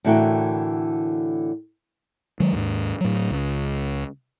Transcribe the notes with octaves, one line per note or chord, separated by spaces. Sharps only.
A2 D3 E3 F#4 A#4 G5
D#3 F#3 G#3
D#2 G#2
A2 F#3
C#2